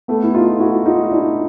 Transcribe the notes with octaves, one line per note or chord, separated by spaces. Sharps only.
A3 B3
E4
D#4 F4
E4 F#4
D#4 F4
F4
D4 E4